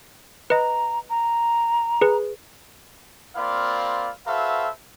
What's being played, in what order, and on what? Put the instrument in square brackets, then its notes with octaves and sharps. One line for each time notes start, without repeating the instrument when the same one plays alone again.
[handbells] B4 D#5 [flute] A#5
[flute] A#5
[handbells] G#4 B4
[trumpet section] A#3 C4 F4 D5 F5 B5
F#4 A4 B4 C5 E5 F5